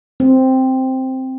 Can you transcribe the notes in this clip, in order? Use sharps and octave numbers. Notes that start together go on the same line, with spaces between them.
C4